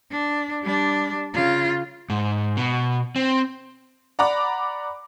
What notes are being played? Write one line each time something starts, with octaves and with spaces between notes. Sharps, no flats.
D4
G3 D4
C#3 F4
G#2
B2
C4
D5 F#5 A#5 B5 D6